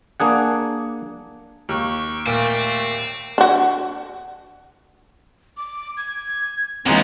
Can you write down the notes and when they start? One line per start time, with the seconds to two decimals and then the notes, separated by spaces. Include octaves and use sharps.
0.20 A#3 D4 G#4 F#5
1.69 D#2 G5 C#6
2.27 A#2 A3 C5 G5
3.38 D4 F#4
5.57 D6
5.97 G#6
6.86 D#2 E3 G#3 B3 C4 A#5